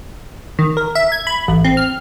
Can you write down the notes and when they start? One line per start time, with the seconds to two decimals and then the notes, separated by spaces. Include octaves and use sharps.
0.59 D#3
0.77 A#4
0.95 E5
1.12 G#6
1.27 B5
1.48 A1
1.65 C4
1.77 F6